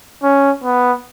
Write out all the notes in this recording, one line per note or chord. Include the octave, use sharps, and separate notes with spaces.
C#4
B3